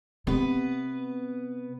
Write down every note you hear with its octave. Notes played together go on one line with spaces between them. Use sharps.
C3 B3 B4